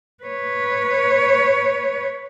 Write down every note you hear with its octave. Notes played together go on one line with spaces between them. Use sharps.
B4 C#5